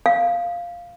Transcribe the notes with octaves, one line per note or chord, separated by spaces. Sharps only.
F5